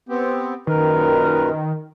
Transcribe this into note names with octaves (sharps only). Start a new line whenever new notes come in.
B3 C4 G4
F#2 A#2 D#3 A#4 B4